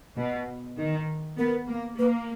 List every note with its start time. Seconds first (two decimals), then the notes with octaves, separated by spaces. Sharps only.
0.17 B2
0.78 D#3
1.38 B3 A#4
1.68 A#3
1.98 A#3 B4